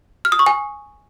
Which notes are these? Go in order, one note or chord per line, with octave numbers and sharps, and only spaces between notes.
F6
D#6
C#6
G#5